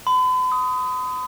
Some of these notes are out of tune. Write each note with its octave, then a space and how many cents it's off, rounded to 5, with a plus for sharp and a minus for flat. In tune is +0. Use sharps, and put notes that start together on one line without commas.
B5 +45
D#6 +10